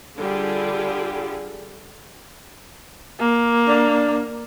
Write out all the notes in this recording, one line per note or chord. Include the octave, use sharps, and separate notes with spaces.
D3 G3 F4 G4 G#4
A#3
D4